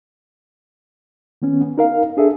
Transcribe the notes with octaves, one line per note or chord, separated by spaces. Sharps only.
D#3 B3 C#4
B3
D#4 A#4 F5
D4 G#4 A4 E5